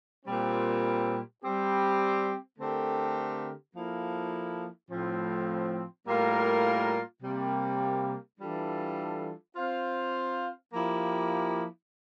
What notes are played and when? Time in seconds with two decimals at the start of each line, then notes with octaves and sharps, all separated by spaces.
0.25 A#2 G3 C4
1.42 G3 C4 G4
2.59 D3 A3 C4 G4 A#4
3.75 F3 A#3 E4 A4
4.91 A2 F3 C4
6.07 A2 G3 A#3 F4 A#4
7.23 C3 G3 A#3
8.40 E3 G3 D4 F4 A4
9.56 C4 F4 C5 F5
10.71 F3 A#3 E4 G4